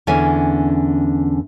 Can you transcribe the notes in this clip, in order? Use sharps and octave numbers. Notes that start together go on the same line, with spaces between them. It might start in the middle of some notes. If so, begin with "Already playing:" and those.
E2 D3 C#4 E4 E5 G#5